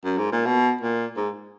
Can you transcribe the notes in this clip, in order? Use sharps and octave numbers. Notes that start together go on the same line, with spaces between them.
F#2
G#2
A#2
B2
A#2
G#2